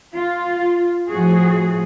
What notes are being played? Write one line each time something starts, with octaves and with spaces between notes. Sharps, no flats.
F4
A2 F3 F#4 G#4